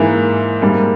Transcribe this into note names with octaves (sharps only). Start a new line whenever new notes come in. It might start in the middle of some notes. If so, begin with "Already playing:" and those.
Already playing: G#2 E3 A#3 E4
G#2 G3 A#3